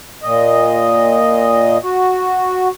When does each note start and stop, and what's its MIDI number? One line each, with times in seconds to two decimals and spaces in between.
0.23 1.77 46
0.23 1.77 75
1.84 2.68 66